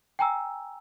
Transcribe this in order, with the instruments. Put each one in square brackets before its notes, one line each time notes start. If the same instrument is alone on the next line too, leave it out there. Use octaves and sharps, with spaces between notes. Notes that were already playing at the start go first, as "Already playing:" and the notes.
[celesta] G5 G#5 A#5 E6